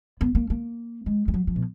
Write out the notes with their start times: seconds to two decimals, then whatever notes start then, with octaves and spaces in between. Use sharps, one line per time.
0.21 B3
0.35 A#3
0.50 A#3
1.06 G#3
1.28 G#3
1.34 F#3
1.47 F3
1.56 B2